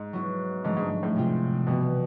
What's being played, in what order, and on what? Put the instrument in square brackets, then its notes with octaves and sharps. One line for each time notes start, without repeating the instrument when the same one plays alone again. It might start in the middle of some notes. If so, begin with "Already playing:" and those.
Already playing: [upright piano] G#2
[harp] F#3 B3 E4
[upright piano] G#2 [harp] D3 F3 A3 C#4
[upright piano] G#2
G#2
A2
[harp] C3 F3 G#3 C4 F4
[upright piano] B2 [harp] E3 G3 B3